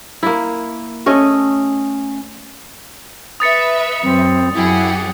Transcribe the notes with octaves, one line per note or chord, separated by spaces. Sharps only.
A#3 E4
A3 C#4 D#5
B4 E5 D#6 A6 C#7
F#2 C4
F#2 E4 G4 G#4 F#5